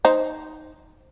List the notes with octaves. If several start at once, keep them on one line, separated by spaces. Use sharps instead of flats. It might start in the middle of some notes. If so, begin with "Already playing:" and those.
D#4 C5